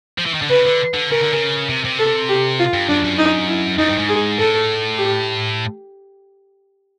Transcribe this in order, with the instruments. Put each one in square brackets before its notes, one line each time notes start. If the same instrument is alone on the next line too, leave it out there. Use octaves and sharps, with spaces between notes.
[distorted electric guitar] F3
E3
D#3
D3
[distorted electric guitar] C#3 [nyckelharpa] B4
[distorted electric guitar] D3
D3
[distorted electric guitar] C#3 [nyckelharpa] A#4
[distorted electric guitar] D3
C#3
C3
C3
[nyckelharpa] A4
G4
F4
[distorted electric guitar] G2
[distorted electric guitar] F#2 [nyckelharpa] D4
[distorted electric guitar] F#2
[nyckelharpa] D#4
E4
[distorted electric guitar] F#2 [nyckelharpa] D#4
[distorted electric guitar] G2
G#2
[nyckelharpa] G#4
[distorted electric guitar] A2 [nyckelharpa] A4
[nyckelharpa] G4